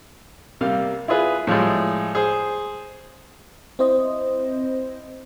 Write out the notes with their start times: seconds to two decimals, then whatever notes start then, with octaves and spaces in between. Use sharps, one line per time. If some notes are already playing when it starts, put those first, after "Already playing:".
0.61 C3 G3 A#3 F5
1.08 E4 F4 G#4 B4
1.47 A2 F3 G3 G#3
2.15 G#4 C5
3.79 C4 E4 C5 D#5